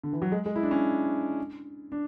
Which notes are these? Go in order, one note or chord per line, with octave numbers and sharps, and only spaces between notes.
D3
E3
F#3
G#3
G#3
E4
D4
C#4
D4